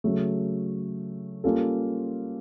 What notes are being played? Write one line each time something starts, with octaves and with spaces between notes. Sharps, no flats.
C#3 F#3 A3
G3 A#3 C#4 F4 A4